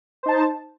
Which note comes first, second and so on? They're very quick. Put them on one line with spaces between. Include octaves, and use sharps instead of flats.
C5 D#4 A5